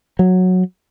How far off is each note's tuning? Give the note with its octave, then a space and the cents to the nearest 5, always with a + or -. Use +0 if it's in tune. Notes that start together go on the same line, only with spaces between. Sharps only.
F#3 -10